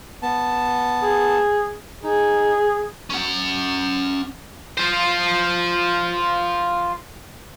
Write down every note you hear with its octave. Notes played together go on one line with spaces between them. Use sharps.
B3 A5
G#4
D#4 G#4
C#4 F#5
F4 C5